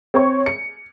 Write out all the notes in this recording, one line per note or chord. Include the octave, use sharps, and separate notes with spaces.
C4 C#5 C#6
C#7